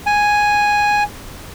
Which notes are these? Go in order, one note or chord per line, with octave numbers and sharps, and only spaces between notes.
G#5